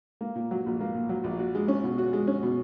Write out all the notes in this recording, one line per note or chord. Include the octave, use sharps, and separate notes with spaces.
A#3
A#2
F#3
A#1
A#3
A#2
F#3
A#1
F#4
G#3
C#4
B2
F#4
G#3
C#4
B2